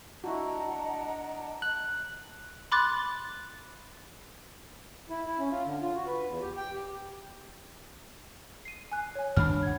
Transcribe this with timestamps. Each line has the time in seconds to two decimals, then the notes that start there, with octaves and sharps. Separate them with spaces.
0.24 D4 E4 F#4 D#5 F#5 A#5
1.62 F#6
2.72 B5 C6 D6 F#6 A6
5.10 E4
5.27 E4
5.39 C#4
5.51 F4
5.66 D3
5.82 F4
5.96 F#4
6.07 B4
6.26 E2
6.42 G4
6.57 G5
6.74 G4
8.65 C7 D#7
8.92 G#5 F#6
9.15 C#5 G#5
9.37 G2 D#3 D4 A5 B5 F6
9.63 F#5 G#6